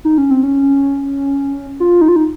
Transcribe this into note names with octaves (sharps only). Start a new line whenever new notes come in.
D#4
C#4
C4
C#4
F4
D#4
F4
D#4